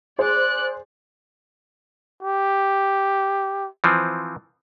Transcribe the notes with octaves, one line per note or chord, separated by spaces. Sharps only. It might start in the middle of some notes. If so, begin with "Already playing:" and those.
G#4 C5 D5 F#6
G4
E3 F3 C4